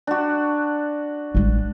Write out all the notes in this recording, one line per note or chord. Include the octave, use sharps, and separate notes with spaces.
D4 F#4
A1 G#3